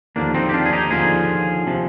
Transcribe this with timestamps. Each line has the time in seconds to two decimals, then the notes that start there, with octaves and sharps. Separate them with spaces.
0.16 D#2 D3 F3 A#3 D4
0.34 C4 D#4
0.49 G4
0.53 D4 F4
0.66 G#4
0.73 D#4 G4
0.91 D#2 D3 F3 F4 G#4
1.67 C3 F3